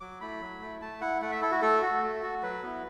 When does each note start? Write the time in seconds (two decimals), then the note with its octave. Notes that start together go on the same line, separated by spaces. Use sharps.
0.01 F#3 D6
0.21 A3 E4 B5
0.41 F#3
0.61 A3 E4
0.82 A3 A5
1.01 E4 F#5
1.22 A3 F#5
1.32 E5
1.42 E4 A4
1.52 F#4
1.62 A3 A4
1.82 F#4
2.02 A3
2.23 F#4
2.43 F#3 B4
2.63 B3 E4